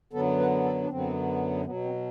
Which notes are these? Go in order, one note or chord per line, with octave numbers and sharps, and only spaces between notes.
F#2 D3 F#3 B3 A4
B4
A4
D4
F#2 D3 F#3 B3 C4
B2 F#3 B3
C4